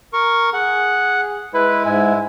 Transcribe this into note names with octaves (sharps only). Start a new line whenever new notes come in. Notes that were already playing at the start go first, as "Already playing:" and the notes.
A#4 C#6
G#4 F#5
G#3 E4 B4
G#2 E5 G#5